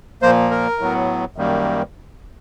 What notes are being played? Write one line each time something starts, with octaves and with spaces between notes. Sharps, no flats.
A#2 F3 A#3 C5
A#4
A2 F#3 B3
F#2 D#3 G3 A#3